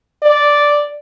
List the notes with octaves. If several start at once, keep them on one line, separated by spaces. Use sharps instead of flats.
D5